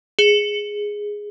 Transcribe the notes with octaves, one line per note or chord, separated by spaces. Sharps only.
G#4